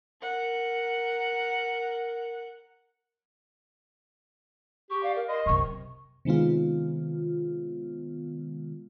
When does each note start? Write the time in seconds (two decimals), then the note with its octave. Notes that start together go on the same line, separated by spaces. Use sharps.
0.21 A#4 F#5
4.90 G4 C#6
5.03 D5 F5
5.16 A#4
5.28 D#5 C6
5.46 F#2 C3 C#6
6.25 C3 D#3 G#3 B3 F4